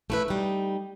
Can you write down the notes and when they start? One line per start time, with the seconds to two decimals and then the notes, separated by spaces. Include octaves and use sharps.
0.10 A3 E4 B4
0.28 G3 D#4